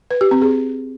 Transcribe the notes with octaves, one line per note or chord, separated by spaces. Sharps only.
B4
G4
C4
G#4